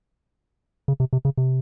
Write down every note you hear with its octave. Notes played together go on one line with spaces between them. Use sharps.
C#3
C3
C3
C#3
C3